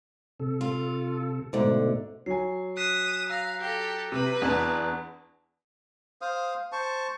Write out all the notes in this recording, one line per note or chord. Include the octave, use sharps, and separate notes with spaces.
C3 A4
F4
G#2 B2 D3 A3
F#3 G#5 C7
D#6 F#6 B6 C7 E7
F5 A#5 E6 A#6
G4 A4 G6 A#6
C3 B4
E2 D4 A5 A#5 F#6
C5 F5 D#6
C5 A5 C#6